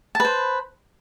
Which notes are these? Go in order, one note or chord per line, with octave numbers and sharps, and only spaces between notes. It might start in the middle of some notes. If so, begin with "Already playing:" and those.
B4 C5 A5